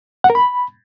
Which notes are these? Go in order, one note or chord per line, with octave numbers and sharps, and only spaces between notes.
F#5
A#4
B5